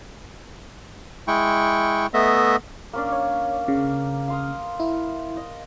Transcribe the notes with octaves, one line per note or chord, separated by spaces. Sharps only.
G#3 E4 G5 C#6
A3 B3 D#5 E5
A#3 C#4 D4
C#5
C#3
F5 C6 D#6
E4
D#5